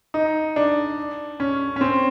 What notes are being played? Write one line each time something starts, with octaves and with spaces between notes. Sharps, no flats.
D#4
D4
C#4
C#4
C4